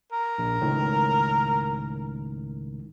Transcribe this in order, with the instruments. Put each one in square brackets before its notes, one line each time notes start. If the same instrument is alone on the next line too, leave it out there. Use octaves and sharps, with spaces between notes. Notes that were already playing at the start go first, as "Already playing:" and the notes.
[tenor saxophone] A#4
[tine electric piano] A#1
C#2 A2 D#3